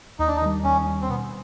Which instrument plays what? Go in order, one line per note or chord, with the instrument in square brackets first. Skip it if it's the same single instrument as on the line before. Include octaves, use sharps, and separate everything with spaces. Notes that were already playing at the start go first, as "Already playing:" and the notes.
[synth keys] D#2 [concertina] D#4
[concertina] D4
D#4
[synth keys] D#3 G3
[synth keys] D#2 [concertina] C#4
[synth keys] D#3 G3
[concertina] C4
[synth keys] B2 [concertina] B3